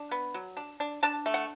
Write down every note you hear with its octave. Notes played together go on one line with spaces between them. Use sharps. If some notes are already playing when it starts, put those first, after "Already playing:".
Already playing: D4
B3
F#3
D4
D4
D4 A5
A3
F#5